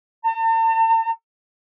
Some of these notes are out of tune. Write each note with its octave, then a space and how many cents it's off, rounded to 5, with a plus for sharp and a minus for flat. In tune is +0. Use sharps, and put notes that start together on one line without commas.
A5 +45